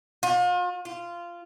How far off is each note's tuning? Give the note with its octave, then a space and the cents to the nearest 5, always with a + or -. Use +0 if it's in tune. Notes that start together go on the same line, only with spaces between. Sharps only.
F4 +40
F4 -15